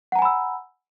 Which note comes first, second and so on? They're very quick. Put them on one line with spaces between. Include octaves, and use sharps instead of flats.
F#5 A#5 G#5 B5 E6